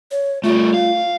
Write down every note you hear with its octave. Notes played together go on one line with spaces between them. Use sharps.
C#5
G3 A3 F4
F5